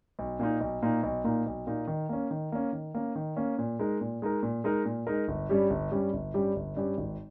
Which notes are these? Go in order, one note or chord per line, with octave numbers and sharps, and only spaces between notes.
B1
A#2 A#3 D#4
B1
A#2 A#3 D#4
B1
A#2 A#3 D#4
B1
A#2 A#3 D#4
D#3
A#3 C#4
D#3
A#3 C#4
D#3
A#3 C#4
D#3
A#3 C#4
A#2
G#3 D#4 A#4
A#2
G#3 D#4 A#4
A#2
G#3 D#4 A#4
A#2
G#3 D#4 A#4
G1
G2 G3 C#4 G4
G1
G2 G3 C#4 G4
G1
G2 G3 C#4 G4
G1
G2 G3 C#4 G4
G#1